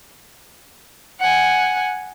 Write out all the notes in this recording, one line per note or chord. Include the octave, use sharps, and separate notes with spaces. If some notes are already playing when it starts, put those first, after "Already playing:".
F#5 G#5